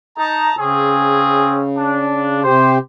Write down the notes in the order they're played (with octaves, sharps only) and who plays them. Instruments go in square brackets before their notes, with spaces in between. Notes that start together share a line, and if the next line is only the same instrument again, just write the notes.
[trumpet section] D#4 [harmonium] A5 A#5
[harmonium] C#3 [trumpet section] C4 C#4 G#4
[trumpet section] D4
[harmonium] C3 G4 [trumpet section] C5